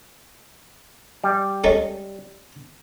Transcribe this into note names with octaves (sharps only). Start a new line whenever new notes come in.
G3
G#3 A3 C#4